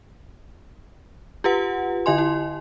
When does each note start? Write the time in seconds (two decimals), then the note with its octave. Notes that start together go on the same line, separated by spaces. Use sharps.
1.44 F4 G4 B4 F#5
2.06 D3 E4 D#5 G#5 C6
2.18 E4